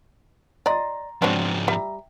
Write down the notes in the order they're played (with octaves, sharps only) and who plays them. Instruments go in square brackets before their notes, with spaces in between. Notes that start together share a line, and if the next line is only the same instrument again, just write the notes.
[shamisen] D5 D#5 [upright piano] A#5 C6 A6
[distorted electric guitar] G#2 F3 [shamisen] F#3 C4 D4
[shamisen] G3 [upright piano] E5 A#5